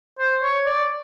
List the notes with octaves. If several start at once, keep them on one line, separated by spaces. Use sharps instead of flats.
C5
C#5
D5